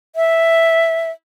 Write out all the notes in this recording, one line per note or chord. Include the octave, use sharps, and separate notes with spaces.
E5